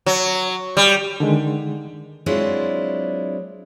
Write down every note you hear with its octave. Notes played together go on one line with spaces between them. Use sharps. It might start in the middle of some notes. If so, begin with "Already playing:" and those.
F#3
G3
D3 D#3 G#3
F#3 G#3 C4 D4 E4 F4